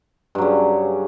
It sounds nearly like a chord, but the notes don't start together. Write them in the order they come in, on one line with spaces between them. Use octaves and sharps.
G2 F#3 C#3